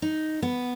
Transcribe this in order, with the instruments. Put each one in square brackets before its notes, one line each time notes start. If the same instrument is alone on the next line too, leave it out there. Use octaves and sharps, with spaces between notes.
[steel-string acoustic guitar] D#4
B3